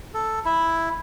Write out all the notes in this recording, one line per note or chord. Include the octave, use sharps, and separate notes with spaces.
A4
E4